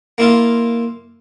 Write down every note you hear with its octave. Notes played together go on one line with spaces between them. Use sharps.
A#3 E4 F4